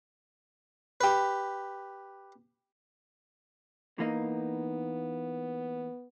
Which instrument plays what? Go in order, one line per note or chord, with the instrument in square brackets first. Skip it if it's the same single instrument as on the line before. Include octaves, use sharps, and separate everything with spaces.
[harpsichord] G4 B4
[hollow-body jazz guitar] E3 A#3 D#4 [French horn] B3